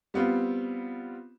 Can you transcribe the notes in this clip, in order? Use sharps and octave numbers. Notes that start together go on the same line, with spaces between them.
G3 B3 C4 F4